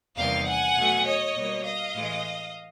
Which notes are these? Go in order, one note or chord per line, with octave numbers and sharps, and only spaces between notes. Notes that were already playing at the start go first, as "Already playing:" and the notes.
E2 C3 D#3 G3 A#3 F5 G5
F#5 G#5
B2 F#3 A3
C#5 D#5
B2 G3 A#3
D#5 F5
A2 E3 G#3